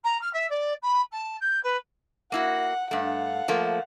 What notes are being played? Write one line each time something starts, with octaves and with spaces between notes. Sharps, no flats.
A#5
F6
E5
D5
B5
A5
G6
B4
A#3 E4 F#4 F#5
G2 A3 F5 F#5
F3 A3 A#3